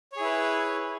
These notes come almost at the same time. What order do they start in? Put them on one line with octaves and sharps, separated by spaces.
C#5 G#4 E4 B4